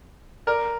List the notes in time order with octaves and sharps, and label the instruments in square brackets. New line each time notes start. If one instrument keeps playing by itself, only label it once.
[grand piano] A#4 D5